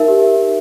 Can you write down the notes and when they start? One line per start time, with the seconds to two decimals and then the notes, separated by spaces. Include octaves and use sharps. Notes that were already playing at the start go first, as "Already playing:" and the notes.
Already playing: D#4 A#4 E5
0.08 G4